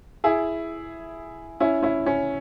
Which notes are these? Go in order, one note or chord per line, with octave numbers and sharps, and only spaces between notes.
E4 G#4
C#4 E4
C#4 E4
C#4